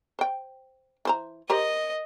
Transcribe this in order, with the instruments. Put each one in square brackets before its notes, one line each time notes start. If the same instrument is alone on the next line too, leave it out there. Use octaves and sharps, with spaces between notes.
[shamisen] C5 G5
E3 C5 A#5
[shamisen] G4 A#4 C5 [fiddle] D#5